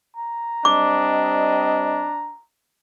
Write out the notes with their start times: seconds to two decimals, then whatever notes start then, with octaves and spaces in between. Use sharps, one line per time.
0.17 A#5
0.65 G3 C4 D4 D#5 D6